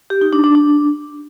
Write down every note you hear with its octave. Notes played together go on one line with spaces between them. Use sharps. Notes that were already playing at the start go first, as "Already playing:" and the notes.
G4
D#4
D4
D4
D4